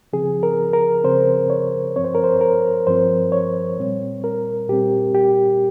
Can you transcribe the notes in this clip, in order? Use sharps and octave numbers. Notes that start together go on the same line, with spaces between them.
C#3 F3 C4 G#4
A#4
A#4
C#3 F3 C4 C5
C#5
G2 F3 C4 C#5
C5
A#4
C5
A#4
G2 F3 C4 C5
C#5
A#2 G3 C4
A#4
A#2 G3 C4 G4
G4